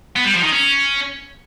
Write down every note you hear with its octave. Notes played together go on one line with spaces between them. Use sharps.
B3
G3
F3
D#3
C#4